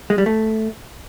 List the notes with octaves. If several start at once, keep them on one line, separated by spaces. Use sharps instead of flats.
G#3
G3
A3